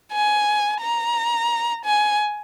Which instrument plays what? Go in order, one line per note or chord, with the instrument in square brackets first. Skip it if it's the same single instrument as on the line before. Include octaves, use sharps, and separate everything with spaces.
[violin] G#5
A#5
G#5